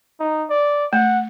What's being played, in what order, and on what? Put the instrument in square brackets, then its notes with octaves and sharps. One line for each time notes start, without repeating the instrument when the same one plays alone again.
[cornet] D#4
D5
[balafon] A3 [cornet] F#5